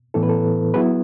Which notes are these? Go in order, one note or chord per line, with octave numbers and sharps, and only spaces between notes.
A2 E3 B3 E4 A4
B4
A4
F#3 B3 E4 G#4 B4